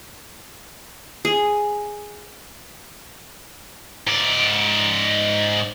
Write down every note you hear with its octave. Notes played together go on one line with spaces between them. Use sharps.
G#4
G#2 D5